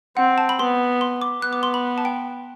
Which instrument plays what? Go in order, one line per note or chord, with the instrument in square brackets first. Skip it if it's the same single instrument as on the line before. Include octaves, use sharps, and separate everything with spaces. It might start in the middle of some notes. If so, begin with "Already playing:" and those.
[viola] C4 [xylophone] F#5
[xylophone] A5
B5
[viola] B3 [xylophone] C6
[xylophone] C6
D6
[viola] B3 [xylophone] F#6
[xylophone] D6
C6
B5
A5
G5